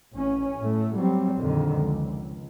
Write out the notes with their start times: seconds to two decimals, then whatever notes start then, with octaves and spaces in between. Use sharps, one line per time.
0.13 A1 C#4
0.59 A2 A3
0.97 F#3 G3 C4
1.37 A#1 F2 D3 D#3
1.79 C#2